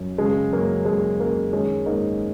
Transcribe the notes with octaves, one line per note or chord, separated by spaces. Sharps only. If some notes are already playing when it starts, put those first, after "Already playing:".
Already playing: F#2
C#3 G#3
F#2 A#3
F#2 G#3
F#2 A#3
D#3 G#3 C#4
G#2 A#3 D#4